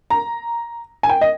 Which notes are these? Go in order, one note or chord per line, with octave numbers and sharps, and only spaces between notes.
A#5
G#5
G5
D#5